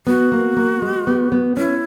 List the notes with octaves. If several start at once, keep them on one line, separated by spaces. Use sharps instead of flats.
B3 F#4
A#3
A#3
G#3
B3
B3
C#4 E4